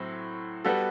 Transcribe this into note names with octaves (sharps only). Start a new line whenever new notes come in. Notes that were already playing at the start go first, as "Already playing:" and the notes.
Already playing: A2 F#3 C4
G3 B3 F#4 A4